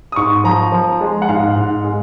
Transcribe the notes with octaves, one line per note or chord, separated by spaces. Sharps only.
D#6
G#2 C#6
F3 A#5
F3
G#3
F#5
G#2 F5
G#2
G#3